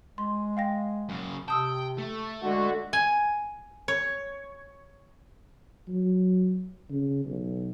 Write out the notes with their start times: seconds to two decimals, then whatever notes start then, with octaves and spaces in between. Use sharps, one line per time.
0.18 G#3 C6
0.57 F5 G5 A#6
1.09 F#2 C#3
1.48 C3 G5 A5 D#6 E6
1.98 A3
2.42 D3 G#3 F#4
2.93 G#5
3.88 C#5
5.88 F#3
6.90 C#3
7.25 B1